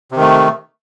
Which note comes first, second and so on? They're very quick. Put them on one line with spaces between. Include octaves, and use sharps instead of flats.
C3 D#3 A3